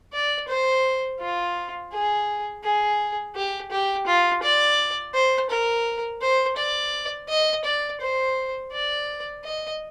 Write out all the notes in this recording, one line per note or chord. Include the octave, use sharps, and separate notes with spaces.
D5
C5
F4
G#4
G#4
G4
G4
F4
D5
C5
A#4
C5
D5
D#5
D5
C5
D5
D#5